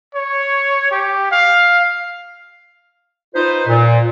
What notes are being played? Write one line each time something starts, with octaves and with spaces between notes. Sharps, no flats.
C#5
G4
F5
D#4 F4 B4 C5
A#2